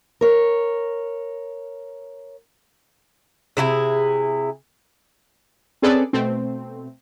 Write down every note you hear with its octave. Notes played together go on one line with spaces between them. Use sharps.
A#4 C#5
C3 D4 E4 G#4
C4 C#4 G#4 A4 B4 D5
B2 A3 C4